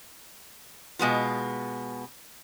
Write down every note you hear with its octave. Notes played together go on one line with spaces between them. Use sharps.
B2 G#3 B3 F4